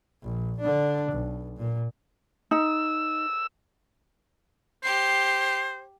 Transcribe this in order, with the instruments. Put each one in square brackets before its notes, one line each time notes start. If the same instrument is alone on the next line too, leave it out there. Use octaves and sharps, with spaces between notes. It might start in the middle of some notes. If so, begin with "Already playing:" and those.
[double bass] A#1
D3 D4
B1
A#2
[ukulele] D#4 [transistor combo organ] E6
[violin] G4 C7 [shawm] C5